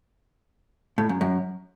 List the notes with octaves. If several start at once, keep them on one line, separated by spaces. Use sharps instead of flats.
A2
F#2
F#2